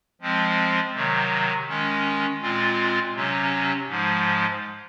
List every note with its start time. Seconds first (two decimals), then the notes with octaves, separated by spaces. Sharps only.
0.21 F3 G#3 C4
0.94 C3 D#3 F#3
1.67 D#3 G#3 C#4
2.41 A#2 G#3 C4 F4
3.14 C3 F#3 C#4
3.87 G#2 F3 G#3